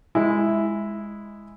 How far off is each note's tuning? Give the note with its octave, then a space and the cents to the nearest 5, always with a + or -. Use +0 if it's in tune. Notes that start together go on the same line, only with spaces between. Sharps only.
G#3 -5 E4 +0